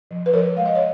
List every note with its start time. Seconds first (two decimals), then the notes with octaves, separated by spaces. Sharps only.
0.11 F3
0.26 B4
0.33 F3 A#4 C#5
0.56 G#3 F5
0.65 D#5
0.75 C#5